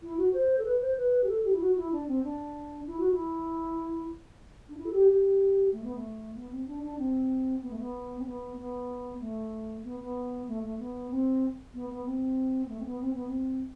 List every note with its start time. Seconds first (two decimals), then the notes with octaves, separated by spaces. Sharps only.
0.02 E4
0.17 F#4
0.33 C5
0.58 A4
0.64 B4
0.80 C5
0.96 B4
1.23 G4
1.28 A4
1.44 G4
1.52 E4
1.59 F#4
1.76 E4
1.92 D4
2.07 C4
2.23 D4
2.86 E4
2.99 F#4
3.11 E4
4.68 D4
4.76 E4
4.86 A4
4.92 G4
5.08 G4
5.72 A3
5.83 B3
5.95 A3
6.35 B3
6.51 C4
6.66 D4
6.83 D4
6.98 C4
7.62 B3
7.70 A3
7.78 B3
8.18 C4
8.25 B3
8.56 B3
9.20 A3
9.83 B3
9.99 B3
10.47 A3
10.63 A3
10.79 B3
11.10 C4
11.73 B3
11.89 B3
12.05 C4
12.64 B3
12.68 A3
12.79 C4
12.85 B3
13.00 C4
13.13 B3
13.27 C4